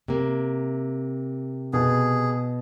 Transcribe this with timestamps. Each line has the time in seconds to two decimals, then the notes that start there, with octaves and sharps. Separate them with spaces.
0.08 C3 A#3
1.73 B2 G#4